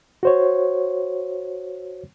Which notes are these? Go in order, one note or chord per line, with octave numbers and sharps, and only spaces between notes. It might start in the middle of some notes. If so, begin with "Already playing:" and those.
F#4 C5 C#5